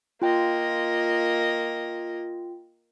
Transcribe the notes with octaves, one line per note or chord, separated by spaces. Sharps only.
A#3 F4 D#5 G5